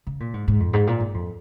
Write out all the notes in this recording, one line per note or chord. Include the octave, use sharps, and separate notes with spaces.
C#3
A#2
G#2
G#2
F2
G#2
A#2
G#2
F2